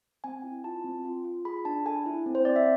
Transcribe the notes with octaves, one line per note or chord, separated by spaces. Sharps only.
C4 G#5
E4
F4 A5
C4
F4
F4
G#4 B5
D4 A5
A4 G#5
E4
C4
C5
C4 D5
E5